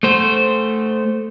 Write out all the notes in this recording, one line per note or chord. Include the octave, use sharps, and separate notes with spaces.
A3 C5